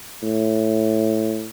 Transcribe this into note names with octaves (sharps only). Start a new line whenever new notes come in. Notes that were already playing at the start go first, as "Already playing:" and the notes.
A2